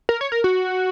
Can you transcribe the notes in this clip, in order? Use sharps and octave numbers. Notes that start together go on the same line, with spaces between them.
A#4
C#5
A#4
F#4